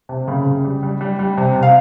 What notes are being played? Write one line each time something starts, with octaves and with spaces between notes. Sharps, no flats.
C3
C#3
C#3
G3
G3
G3
G3
C3
C3
F5